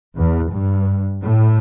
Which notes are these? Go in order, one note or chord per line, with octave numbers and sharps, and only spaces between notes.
E2
G2
A2